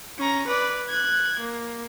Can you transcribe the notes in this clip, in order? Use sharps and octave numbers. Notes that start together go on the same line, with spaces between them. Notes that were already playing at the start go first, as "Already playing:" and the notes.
C#4 A#5
B4 D5
F#6 G#6
A#3